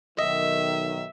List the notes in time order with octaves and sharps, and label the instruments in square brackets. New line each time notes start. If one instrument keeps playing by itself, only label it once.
[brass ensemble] B1 D#3 [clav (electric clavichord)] D#5 [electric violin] E5